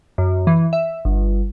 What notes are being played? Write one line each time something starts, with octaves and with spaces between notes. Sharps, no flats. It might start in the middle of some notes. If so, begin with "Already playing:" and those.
F#2
E3
E5
G1